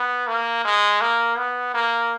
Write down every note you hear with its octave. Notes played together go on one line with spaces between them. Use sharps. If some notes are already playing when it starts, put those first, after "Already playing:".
Already playing: B3
A#3
G#3
A#3
B3
A#3